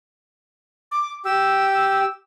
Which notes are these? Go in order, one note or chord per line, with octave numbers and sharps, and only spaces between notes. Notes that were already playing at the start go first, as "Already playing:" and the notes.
D6
G4 E6